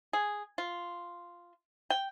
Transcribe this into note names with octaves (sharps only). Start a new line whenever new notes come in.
G#4
F4
G5